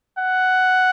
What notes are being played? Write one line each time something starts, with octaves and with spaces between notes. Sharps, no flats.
F#5